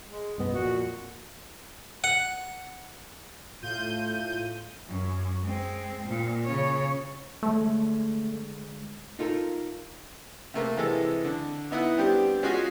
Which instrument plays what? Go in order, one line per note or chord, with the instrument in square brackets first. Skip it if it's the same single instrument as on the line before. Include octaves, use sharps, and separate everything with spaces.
[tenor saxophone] G#3
[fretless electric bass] C2 G2 B3 [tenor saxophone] D#5
[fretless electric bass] F2 A#2 [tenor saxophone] F#4
[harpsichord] F#5
[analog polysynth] A2 F4 G6 D#7
[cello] F#2
G#3 C4
A#2
C#3 C#5
[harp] D3 G#3 C#4 [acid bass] A3
[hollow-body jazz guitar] D#4 F4 A4 A#4
[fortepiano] C3 A3 A#3
C3 E3 G#3 A4
D3
B3 D#4 E4 D#5 F#5
G3 B3 C4 D4 G4
G#3 C#4 F4 F#4 G#4 D#5